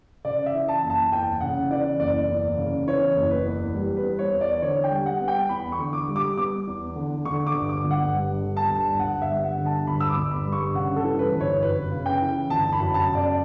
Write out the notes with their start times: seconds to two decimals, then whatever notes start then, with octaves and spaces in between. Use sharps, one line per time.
0.25 C#3 D5
0.46 E5
0.54 E3
0.68 A5
0.83 F#1
0.90 A5
1.12 E2 G5
1.41 C#3 F#5
1.71 E3 D5
2.00 F#1 D5
2.29 E2
2.57 C#3
2.87 E3 C#5
3.16 F#1
3.31 B4
3.46 E2
3.74 G3
3.97 B4
4.04 B3
4.19 C#5
4.33 E2
4.41 D5
4.62 D3 C#5
4.84 G5
4.91 G3
5.06 F#5
5.21 B3
5.28 G5
5.49 E2 B5
5.72 C#6
5.79 D3
5.93 D6
6.08 G3
6.16 D6
6.37 B3 D6
6.67 E2
6.96 D3
7.25 D3 C#6
7.47 D6
7.53 G1
7.69 D6
7.84 G1
7.91 F#5
8.13 G2
8.42 D3
8.57 A5
8.70 G1
8.99 G1 F#5
9.22 E5
9.29 G2
9.43 F#5
9.58 D3
9.66 A5
9.87 G1 B5
10.00 E6
10.09 D6
10.17 G1
10.31 B5
10.45 G2
10.52 C#6
10.74 C#3 F#5
10.96 A4
11.04 E3
11.19 B4
11.33 G1
11.41 C#5
11.62 F#2 B4
11.91 C#3
12.06 G5
12.21 E3
12.50 G1 A5
12.73 B5
12.79 F#2
12.94 A5
13.08 C#3
13.15 D5